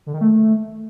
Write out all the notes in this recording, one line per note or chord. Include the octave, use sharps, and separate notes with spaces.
D3
D#3
A3